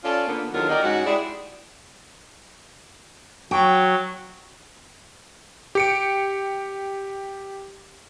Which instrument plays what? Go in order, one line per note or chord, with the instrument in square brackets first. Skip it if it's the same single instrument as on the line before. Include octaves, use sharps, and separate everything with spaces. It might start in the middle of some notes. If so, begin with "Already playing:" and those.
[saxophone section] C#4 F4 A4 C#5 D5
D3 A#3 B3
E2 D3 D#3 F#3 F4 A#4
F#4 G4 A#4 D5 D#5
G#2 G#3 C#4 F#4
G#3 E4 G4 G#4 D5
[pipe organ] F#3 [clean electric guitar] F#4 [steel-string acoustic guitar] G5
[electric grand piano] G4 C#7 D7